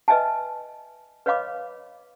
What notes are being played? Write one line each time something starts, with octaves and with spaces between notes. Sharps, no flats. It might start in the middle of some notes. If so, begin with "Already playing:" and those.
B4 D#5 E5 G#5 A5
B4 C#5 D#5 F5 B5 D6